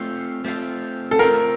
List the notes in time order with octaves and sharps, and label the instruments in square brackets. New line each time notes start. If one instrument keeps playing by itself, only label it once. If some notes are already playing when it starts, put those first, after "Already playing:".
Already playing: [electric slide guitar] A3 C4 F4
A3 C4 F4
[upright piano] A4
[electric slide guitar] A3 C4 F4 [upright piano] A#4